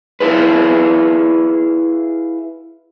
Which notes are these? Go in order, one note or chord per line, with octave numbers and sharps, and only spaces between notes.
E4 F4 G#4 B4